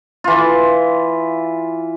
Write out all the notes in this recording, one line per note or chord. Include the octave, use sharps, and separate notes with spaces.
E3 F4